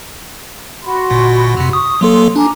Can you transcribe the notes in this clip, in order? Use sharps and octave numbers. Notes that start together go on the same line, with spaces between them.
F#4 B5 C6
G1 A#2
F2 C3
C#6 D#6
F#3 A#3 A4 C6
D4 G#5 A#5 D6